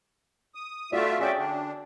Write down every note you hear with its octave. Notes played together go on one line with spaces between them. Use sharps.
D#6
A3 F4 F#4 D5 E5
C#4 F#4 G#4 D5 E5 G5
D3 D4